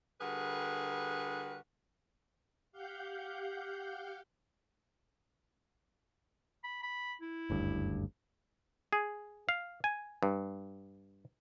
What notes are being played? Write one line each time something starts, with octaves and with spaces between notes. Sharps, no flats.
D3 G3 F#4 G#4 A#4 B4
G4 F5 F#5 G6
B5
B5
E4
F#1 D2 G2
G#4
F5
G#5
G2